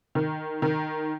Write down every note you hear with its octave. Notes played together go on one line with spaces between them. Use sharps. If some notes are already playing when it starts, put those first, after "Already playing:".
D#3
D#3